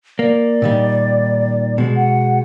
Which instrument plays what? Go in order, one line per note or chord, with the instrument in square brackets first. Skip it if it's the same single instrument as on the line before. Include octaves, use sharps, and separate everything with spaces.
[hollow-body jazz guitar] A#3 [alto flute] D5
[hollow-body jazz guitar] A#2 D#3 G3
B2 G#3
[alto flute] F#5